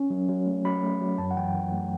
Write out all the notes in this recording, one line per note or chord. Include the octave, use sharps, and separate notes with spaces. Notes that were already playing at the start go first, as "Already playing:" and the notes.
Already playing: C#4
F#3
F#3
A3
F#3 B5
A3
F#3
F#2 A5
F#5
E3 G5
E3
A3